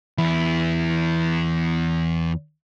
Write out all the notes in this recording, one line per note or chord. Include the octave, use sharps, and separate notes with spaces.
E2 E4